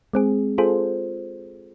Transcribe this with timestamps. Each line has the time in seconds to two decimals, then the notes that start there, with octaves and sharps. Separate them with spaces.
0.13 G#3 C4 G#4
0.58 F4 G#4 A4 C5